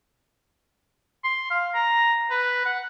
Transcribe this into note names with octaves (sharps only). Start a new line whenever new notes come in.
C6
F5
A#5
B4
F#5